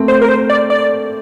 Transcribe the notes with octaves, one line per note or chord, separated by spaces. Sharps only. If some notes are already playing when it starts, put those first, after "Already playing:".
Already playing: A3 A#3 C4
C5
A#4
C5
D5
D5